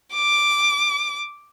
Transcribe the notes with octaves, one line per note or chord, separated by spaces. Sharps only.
D6